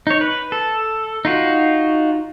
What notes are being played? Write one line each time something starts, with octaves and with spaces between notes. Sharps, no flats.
D#4 C#5
B4
A4
D#4 F4 F#4